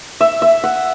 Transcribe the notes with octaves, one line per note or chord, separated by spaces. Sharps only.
E5
E5
F#5